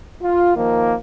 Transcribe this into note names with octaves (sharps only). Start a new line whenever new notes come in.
F4
D#3 F3 A#3